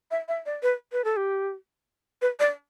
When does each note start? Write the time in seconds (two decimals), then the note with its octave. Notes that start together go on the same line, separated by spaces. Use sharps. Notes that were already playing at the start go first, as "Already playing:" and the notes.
0.11 E5
0.28 E5
0.46 D5
0.63 B4
0.92 B4
1.04 A4
1.17 G4
2.22 B4
2.40 D5